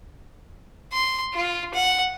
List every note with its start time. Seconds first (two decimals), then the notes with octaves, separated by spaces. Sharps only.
0.93 C6
1.34 F4
1.74 F#5